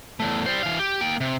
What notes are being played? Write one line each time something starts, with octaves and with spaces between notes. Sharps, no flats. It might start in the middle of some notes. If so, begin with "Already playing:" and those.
E2 A3
G3 C5
E3 F5
G4
A#3 G5
C3